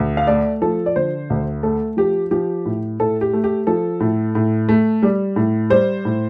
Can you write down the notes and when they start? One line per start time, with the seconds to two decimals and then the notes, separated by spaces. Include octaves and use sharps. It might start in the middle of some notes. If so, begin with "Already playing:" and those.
Already playing: D2
0.17 F5
0.27 A3 D5
0.62 F3 A4
0.86 D5
0.96 D3 C5
1.30 D2
1.63 A3 A4
1.97 F3 G4
2.31 F3 G4
2.65 A2
3.00 A2 A4
3.21 G4
3.33 A3
3.44 G4
3.67 F3 A4
4.00 A2
4.35 A2
4.69 A3
5.03 G3
5.36 A2
5.70 G3 C5
6.05 A2